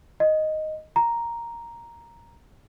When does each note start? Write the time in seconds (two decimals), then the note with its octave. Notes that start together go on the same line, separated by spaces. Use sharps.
0.20 D#5
0.96 A#5